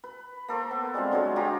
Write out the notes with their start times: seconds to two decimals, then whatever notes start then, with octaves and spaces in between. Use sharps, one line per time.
0.04 B4
0.48 A#3 A4 C5 C#6
0.71 B3
0.94 G3 G#3 C4 F4
1.11 D3 F#3 G#3 C#5
1.36 F4 G4 G#4 A#5